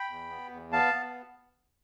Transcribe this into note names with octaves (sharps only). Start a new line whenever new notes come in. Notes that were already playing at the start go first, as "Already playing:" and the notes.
Already playing: G5 B5
E2
B3
E2
B3 F5 A5
B3